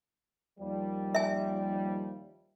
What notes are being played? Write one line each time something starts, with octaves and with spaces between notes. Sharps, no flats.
D#2 F3 G3
E5 G#5